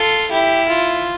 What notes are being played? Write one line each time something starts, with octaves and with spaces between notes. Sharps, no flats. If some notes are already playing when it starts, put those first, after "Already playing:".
Already playing: F4 A4
E4 G4
F4